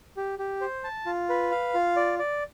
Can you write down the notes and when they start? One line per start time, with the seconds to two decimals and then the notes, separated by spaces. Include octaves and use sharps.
0.17 G4
0.39 G4
0.61 C5
0.84 A5
1.06 F4
1.29 B4
1.51 F5
1.74 F4
1.96 D5
2.19 D5